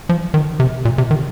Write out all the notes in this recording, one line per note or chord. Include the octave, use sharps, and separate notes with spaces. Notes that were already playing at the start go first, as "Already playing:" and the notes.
F3
D#3
C3
A#2
C3
D#3